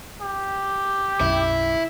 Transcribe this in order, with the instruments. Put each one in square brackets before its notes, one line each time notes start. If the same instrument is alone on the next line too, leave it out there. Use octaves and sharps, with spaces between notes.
[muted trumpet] G4
[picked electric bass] B1 F#2 [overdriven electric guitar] E4